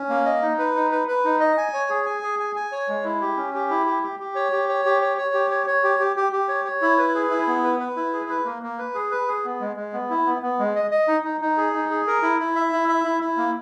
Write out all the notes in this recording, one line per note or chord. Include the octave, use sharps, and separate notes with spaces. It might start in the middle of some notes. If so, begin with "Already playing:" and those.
Already playing: C#4
A#3
D#5
D#4
B4
D#4
B4
B4
D#4
D#5
G#5
C#5
G#4
G#5
G#4
G#5
G#5
C#5
G#3
E4
G4
C#4
G4
E4
G4
G4
G4
C#5
G4
C#5
G4
C#5
C#5
G4
C#5
C#5
G4
G4
G4
G4
C#5
C#5
E4
B4
G#4
E4
B3
B4
B4
E4
G#4
B4
A#3
A#3
B4
G#4
B4
G#4
B3
G#3
G#3
B3
E4
B3
B3
G#3
D#5
D#5
D#4
D#4
D#4
G#4
D#4
G#4
A#4
E4
E4
E5
E4
E5
E4
E4
A#3